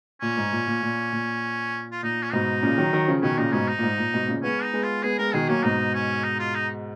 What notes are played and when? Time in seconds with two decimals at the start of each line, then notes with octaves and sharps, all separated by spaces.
0.22 A#2 C#4
0.37 G#2
0.52 A#2
0.67 A#2
0.82 A#2
1.12 A#2
1.92 F4
2.03 A#2 D#4
2.23 C#4
2.32 G#2 B2 D#4
2.63 A#2 C#3
2.78 D#3 F#3
2.93 D#3 F#3
3.08 C#3 F3
3.22 B2 D#3 C#4
3.38 A#2 C#3 D#4
3.53 G#2 B2 C#4
3.68 D#4
3.78 A#2
3.83 G#2
3.98 A#2
4.13 G#2 B2
4.28 A#2 C#3
4.43 G#3 B3 C#4
4.63 D#4
4.73 G#3 B3
4.83 F4
5.03 G#3 B3 G#4
5.18 G#3 B3 A#4
5.34 B2 D#3 G#4
5.48 F#3 A#3 C#4
5.63 G#2 B2 D#4
5.94 C#4
6.24 D#4
6.39 F4
6.55 D#4